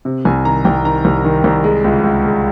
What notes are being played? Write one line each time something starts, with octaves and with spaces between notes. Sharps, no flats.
C3
C2 G#5
D#3 A#5
C2 G5
D#3 A#5
C2
D#3
C2
G#3
C#2
C#2
G#3